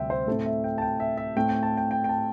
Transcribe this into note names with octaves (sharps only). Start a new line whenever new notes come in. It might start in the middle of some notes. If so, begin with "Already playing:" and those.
Already playing: D2 C3 G3 C4 E5 G5
C5
A2 A3 C4 A4
E5
G5
A5
G5
E5
E5
A2 A3 C4 G5
G5
A5
G5
G5
G5
A5